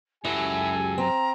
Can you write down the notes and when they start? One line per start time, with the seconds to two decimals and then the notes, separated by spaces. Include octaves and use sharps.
0.25 C#2 F#2 F#3 E4 G4 A4 G#5
0.98 C4 A#5